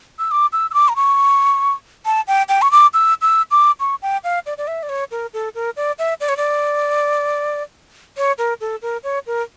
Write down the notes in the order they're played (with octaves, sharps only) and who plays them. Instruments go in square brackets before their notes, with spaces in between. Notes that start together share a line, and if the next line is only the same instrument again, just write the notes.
[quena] E6
D6
E6
E6
D6
A#5
C#6
A5
G5
G5
C#6
D6
E6
E6
D6
C#6
G5
F5
D5
D5
E5
D5
C#5
A#4
A4
A#4
D5
E5
D5
C#5
D5
C#5
A#4
A4
A#4
C#5
A#4